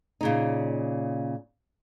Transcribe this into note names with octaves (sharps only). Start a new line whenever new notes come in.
A#2 C#3 D#4